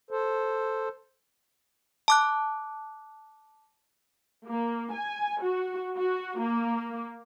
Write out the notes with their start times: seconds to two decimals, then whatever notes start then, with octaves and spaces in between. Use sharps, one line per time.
0.11 A4 C5
2.08 A5 D6 F#6
4.48 A#3
4.93 G#5
5.43 F#4
5.96 F#4
6.40 A#3